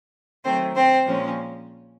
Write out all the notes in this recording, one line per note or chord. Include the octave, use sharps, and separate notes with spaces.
D#3 F#3 A3 C4 C5
C4 C5
A#2 F3 G#3 C#4